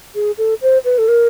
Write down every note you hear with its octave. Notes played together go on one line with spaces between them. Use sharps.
G#4
A4
C5
B4
A4
A#4